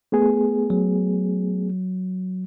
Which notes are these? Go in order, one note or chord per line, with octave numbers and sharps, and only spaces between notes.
A3 B3 G#4
F#3